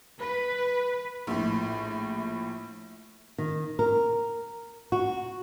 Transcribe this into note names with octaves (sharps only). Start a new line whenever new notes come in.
B4
A#1 A2
D#3
A#4
F#4